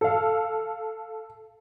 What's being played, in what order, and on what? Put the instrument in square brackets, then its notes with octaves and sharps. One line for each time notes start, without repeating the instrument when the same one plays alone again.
[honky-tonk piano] A4 F5